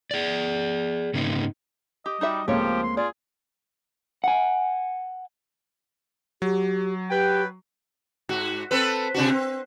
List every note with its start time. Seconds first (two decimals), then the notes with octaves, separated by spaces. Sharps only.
0.11 G#4 D5
1.14 G#2 C#3 A#3 D#4 C5
2.06 G4 D#5
2.21 G3 D#4 F#4 E5
2.48 C#2 F3 A3 A#3 C4 G4 C#5
2.83 C6
2.97 F4 G#4 D5
4.24 F#5 G#5
6.42 F#3 G4
7.10 G4 B4 G5
8.29 G#2 F#4
8.71 C4 A4 B4
9.14 C3 D4 F#4
9.30 C4